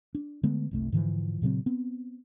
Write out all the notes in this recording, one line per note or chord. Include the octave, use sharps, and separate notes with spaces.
D4
D3 G#3 A3 B3
F#1 C2 A3
G#2 D3 E3 F3
A#2 C#3 F#3 C4
B3 C4